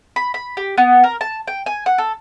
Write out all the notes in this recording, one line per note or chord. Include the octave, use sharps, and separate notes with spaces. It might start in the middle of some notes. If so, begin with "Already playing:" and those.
B5
B5
G4
B3
A#4
A5
G5
G#5
F#5
A4